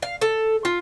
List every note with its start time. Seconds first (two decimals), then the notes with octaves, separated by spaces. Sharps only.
0.02 F5
0.21 A4
0.65 F4